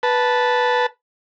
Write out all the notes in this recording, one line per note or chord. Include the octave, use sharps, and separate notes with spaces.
B4 A5